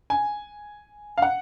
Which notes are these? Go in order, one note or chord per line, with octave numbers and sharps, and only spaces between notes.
G#5
F5
F#5